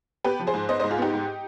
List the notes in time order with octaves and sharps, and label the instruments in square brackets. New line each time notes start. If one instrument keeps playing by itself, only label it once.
[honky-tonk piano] B3 G4 B4
F3
G#4 C5
G#2
B3 C5 D#5
C5 D#5
G#2
F4 G#4
B3 D#4 G4
G#2